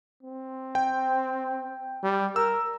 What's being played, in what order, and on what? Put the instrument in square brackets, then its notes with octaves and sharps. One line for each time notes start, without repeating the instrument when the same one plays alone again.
[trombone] C4
[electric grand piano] G5
[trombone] G3
[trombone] A#4 [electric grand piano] E6